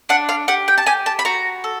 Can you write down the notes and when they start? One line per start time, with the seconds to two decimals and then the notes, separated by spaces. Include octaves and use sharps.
0.09 D4 F#5
0.29 F5
0.48 G4 F#5
0.68 G5
0.78 A5
0.86 G4 G#5
1.06 A5
1.19 B5
1.25 F#4 A#5
1.64 A4